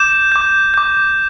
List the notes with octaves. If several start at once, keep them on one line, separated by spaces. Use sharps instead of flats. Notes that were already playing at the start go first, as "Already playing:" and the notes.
Already playing: D6 G6 E7
D6 G6
D6 G6